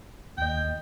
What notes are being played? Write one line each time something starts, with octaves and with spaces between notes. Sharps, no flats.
D#2 D#5 G5